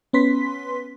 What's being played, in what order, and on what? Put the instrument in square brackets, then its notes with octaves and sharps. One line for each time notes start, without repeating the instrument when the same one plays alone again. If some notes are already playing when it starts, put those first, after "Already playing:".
[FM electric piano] B3 C#4 B4 C6 B6